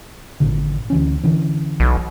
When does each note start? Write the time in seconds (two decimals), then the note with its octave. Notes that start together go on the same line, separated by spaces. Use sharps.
0.40 G#1 A#2 D3
0.90 D2 E3 C#4
1.23 D3 E3 C#4
1.80 B1